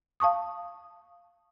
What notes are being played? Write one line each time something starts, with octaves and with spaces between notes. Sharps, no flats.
F5 A5 C#6 D#6